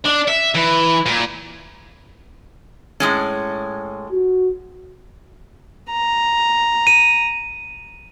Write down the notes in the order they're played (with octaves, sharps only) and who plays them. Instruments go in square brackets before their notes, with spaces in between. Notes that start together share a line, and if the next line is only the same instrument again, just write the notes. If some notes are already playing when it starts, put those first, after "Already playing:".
[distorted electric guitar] D4
E5
E3
A#2
[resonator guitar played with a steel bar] A2 G#3 C#4
[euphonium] F#4
[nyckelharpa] A#5
[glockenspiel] D#7